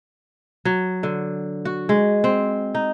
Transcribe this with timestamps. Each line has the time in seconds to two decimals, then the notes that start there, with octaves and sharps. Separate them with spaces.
0.65 F#3
1.03 D3
1.65 F#4
1.89 G#3
2.24 C4
2.75 D#4